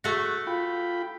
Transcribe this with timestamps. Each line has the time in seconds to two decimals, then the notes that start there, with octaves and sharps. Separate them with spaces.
0.04 A3 F#4
0.47 F4 G5 B5